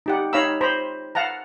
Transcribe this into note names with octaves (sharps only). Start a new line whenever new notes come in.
D#4 G4 F#5
D#4 C#5 F5 A#5 B5 E6
C5 A#5 B5
F5 F#5 A5 A#5